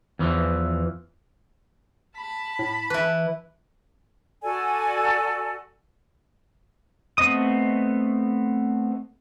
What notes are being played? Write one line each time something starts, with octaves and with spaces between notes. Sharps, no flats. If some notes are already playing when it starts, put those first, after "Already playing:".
E2 E3 F3
A5 B5
A2
E3 E4 B4
F#4 A4 D5 G#5
A3 B3 C4 D#5 D#6